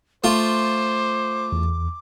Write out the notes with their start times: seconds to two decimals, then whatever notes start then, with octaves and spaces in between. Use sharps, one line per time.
0.24 A3 F4 C5 D6
1.52 E2